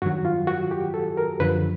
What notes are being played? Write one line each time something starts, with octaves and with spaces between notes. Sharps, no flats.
G2 D#3 F#3 F#4
F4
F#4
G4
A4
A#4
F#2 D3 F3 B4